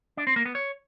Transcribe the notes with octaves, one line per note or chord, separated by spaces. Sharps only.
D4
C4
A#3
B3
C#5